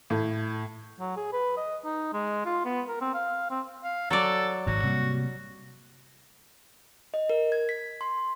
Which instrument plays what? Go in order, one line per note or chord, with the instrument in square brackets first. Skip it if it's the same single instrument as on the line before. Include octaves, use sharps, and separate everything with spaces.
[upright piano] A2
[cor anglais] F#3
G#4
B4
D#5
D#4
G#3
F4
B3
A#4
C4
F5
C4
[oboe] F5
[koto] F#3 D5 [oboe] A4
[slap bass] G#1 G#2 [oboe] F#4
[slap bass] C3 G3 A#3
[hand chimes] D#5
A#4
G#6
B6
C6